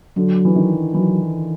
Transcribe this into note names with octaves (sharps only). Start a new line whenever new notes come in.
D3 F#3
E3
D#3
E3 F#3